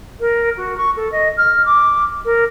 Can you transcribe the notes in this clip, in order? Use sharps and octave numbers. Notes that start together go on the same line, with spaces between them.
A#4
F#4
C#6
A4
D#5
F6
D6
A#4